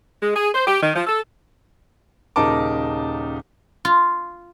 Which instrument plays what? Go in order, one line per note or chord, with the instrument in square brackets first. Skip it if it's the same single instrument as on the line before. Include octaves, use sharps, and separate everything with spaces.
[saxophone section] G#3
G#4
C5
G4
D#3
F3
A4
[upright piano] D#1 C#3 D#4 A#4 A5 D6
[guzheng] F4